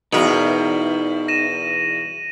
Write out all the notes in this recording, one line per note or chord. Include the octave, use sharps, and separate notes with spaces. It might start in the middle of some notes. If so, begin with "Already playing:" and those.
E2 B2 D#4 A#4 F#7
A#6 D#7 E7